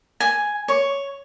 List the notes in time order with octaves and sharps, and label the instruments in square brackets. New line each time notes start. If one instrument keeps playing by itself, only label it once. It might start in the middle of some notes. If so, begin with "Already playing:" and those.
[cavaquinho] G#5
C#5